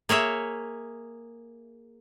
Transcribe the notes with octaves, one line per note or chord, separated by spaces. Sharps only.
A#3 G#4 C#5 E5